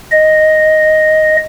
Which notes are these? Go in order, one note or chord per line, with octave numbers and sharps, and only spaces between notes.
D#5